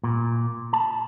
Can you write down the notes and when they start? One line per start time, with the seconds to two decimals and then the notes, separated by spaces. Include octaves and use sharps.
0.04 A#2
0.73 A5